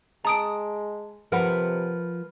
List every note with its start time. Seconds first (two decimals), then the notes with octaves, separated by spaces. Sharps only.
0.25 G#3 A5 A#5 D#6 D7
1.32 C3 F3 A#4 B4 F#5